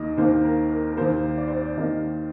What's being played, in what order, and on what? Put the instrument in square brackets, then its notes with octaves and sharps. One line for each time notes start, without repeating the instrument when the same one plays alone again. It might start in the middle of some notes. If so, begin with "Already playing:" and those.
Already playing: [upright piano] D#2 D#3 A#3 D#5
D#2 D#3 A#3 C5
A#4
A#4
A#4
D#2 D#3 A#3 C5
D5
C5
D5
D#2 D#3 A#3 D#5